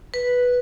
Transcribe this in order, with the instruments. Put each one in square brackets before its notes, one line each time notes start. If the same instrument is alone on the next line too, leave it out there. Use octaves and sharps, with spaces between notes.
[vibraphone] B4